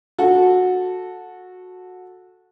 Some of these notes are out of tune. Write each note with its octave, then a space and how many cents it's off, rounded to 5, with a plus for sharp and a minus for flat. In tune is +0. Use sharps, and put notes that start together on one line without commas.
F#4 -15 A4 -5